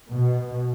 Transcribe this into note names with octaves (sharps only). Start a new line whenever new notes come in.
B2